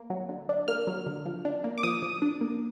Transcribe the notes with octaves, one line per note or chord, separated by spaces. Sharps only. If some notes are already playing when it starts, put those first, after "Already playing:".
Already playing: A#3
F#3
D3
D4
A#3 F6
F#3
D3
F3
D4
A#3
D6
F3 D#6
F3
D4
A#3